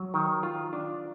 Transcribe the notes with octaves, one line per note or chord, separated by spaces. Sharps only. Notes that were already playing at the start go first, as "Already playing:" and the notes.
Already playing: F#3
D#3
F4
D4